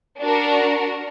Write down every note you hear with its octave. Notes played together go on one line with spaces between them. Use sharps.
D4 F#4 A#4